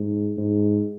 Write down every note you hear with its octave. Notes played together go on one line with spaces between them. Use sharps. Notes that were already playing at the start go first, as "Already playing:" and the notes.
Already playing: G#2
G#2